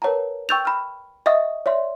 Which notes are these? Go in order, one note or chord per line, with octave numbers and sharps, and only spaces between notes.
A#4 B4 C#5 F#5 A5 A#5
G5 C#6 E6 G6 A6 F7
B5 F6
D#5 E5 F#5 C#6 D#6
C#5 D5 E5 C6